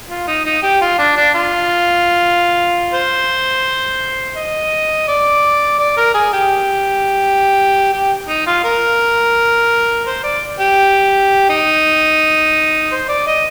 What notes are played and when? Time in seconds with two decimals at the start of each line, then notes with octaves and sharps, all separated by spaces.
0.09 F4
0.27 D#4
0.45 D#4
0.63 G4
0.81 F4
0.99 D4
1.17 D4
1.34 F4
2.94 C5
4.36 D#5
5.08 D5
5.79 D5
5.97 A#4
6.14 G#4
6.33 G4
7.92 G4
8.28 D#4
8.47 F4
8.64 A#4
10.06 C5
10.24 D5
10.60 G4
11.49 D#4
12.92 C5
13.09 D5
13.27 D#5